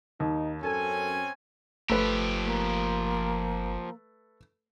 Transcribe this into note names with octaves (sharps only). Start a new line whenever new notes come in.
D#2 D#4
F#2 C4 C#4 A4 G#5
G1 F3 A3 G4 B4
A#3